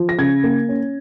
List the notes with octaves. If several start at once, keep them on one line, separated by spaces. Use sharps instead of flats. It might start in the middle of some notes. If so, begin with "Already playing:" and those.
Already playing: F3
A#6
C#3 G#6
A#3
C#4